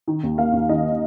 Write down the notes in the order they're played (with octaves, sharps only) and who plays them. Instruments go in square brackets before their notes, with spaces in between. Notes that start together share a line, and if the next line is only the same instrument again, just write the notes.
[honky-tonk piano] D#3
D#2
A#3 F5
D#2
D#3 D#5